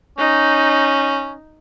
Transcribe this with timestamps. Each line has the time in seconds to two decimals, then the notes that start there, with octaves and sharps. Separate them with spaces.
0.18 C#4 D#4